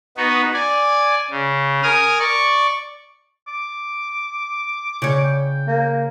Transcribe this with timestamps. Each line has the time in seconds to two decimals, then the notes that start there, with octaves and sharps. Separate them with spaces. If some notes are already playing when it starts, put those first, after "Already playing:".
0.17 B3 D#4 F#4 B4
0.54 D5 G#5
1.30 C#3
1.83 A#4 G#5 D#6 F6
2.19 D5 C#6
3.48 D6
5.02 C#3 C#5
5.23 G5
5.68 A#3